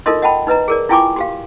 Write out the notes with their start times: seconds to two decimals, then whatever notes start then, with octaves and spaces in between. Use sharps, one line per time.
0.06 D#4 F4 A4 A#4 D#5 C6
0.22 D#5 F#5 G5 A5 B5
0.47 D#4 B4 D#5 A#5
0.68 G#4 A#4 D5
0.89 E4 F4 G5 G#5 C#6 D6
1.16 F#4 G4 F5